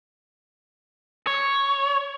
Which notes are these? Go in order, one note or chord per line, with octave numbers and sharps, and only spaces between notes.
C#5